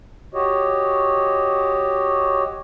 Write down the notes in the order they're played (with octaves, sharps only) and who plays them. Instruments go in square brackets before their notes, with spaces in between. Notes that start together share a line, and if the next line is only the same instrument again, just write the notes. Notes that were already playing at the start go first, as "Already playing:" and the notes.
[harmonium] F#4 G4 C#5 D#5